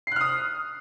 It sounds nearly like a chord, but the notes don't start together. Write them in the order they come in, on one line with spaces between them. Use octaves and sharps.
C7 F#6 F6 D#6